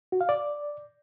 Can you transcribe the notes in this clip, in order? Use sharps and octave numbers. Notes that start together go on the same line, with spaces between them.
F#4
F5
D5